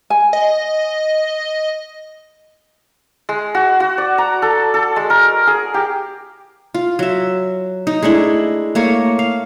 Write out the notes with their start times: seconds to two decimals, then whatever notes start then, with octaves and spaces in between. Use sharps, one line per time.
0.10 G#5
0.33 D#5
3.29 G#3
3.55 F#4
3.80 F#4
3.98 D5
4.18 A#5
4.42 A4
4.74 A4
4.96 G#3
5.10 A#4
5.47 G#4
5.74 G4
6.74 F4
6.99 F#3 E5
7.87 D#4
8.02 G#3 A3 D4 E4
8.75 A3 A#3 C#5
9.19 F5